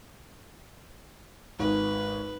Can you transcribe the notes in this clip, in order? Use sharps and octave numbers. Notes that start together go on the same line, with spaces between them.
G#1 G#2 B4